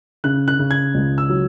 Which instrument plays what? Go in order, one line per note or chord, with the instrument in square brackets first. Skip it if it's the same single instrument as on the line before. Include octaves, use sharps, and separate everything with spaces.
[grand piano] C#3 F#6
F#6
C#3
G#6
C#2
E6
F#3